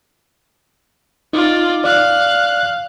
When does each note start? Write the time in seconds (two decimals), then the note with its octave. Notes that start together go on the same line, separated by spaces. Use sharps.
1.33 D#4 F4 D5
1.84 D5 F5 F#6